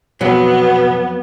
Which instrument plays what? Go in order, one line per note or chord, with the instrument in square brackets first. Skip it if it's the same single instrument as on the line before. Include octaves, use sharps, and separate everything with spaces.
[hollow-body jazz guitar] F2 F#3 [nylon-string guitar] B2 [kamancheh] B3